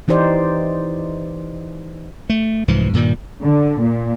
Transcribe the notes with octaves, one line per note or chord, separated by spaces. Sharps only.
E3 D#4 G4 C5 D5
A3
C2 G#2 E3 F3
G2 A#2 D#3 G3
D3
A#2